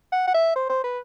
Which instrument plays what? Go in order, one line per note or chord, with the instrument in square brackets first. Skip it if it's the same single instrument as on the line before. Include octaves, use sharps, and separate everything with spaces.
[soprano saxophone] F#5
F#5
E5
C5
C5
B4